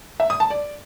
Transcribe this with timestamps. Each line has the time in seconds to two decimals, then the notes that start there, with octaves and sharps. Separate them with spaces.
0.20 E5
0.30 D#6
0.40 A5
0.50 D5